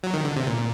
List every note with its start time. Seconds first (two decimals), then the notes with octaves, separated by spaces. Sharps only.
0.03 F#3
0.14 D#3
0.25 D3
0.36 C3
0.47 A#2